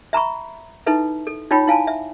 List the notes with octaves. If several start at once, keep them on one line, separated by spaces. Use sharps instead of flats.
E5 A#5 B5 C#6
D#4 E4 A4 B4 E5
A4
D#4 F4 C#5 G5 B5
E4 F5 G#5 A5
E5